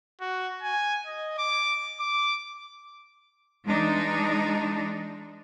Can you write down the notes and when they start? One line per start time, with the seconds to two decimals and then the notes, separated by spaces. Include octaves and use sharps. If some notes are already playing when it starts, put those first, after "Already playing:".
0.21 F#4
0.63 G#5
1.06 D#5
1.38 D6
2.00 D6
3.65 E3 G#3 D4 D#4